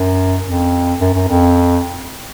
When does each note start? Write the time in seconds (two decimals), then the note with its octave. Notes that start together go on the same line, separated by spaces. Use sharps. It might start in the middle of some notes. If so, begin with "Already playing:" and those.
Already playing: F#2
0.43 F2
1.00 F#2
1.14 F#2
1.28 F2